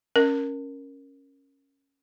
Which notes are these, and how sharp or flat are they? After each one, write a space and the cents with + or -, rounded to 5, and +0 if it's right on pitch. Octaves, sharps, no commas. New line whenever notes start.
C#4 -10 A#4 +0